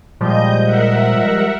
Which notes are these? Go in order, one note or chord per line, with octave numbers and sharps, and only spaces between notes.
A#2 F3 G3 G#3 D#5 G6
A#4 E5 F#5